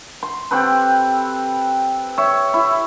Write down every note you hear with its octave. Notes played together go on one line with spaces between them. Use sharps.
C6
C4 G4 A4 B4
C#5 E5
E4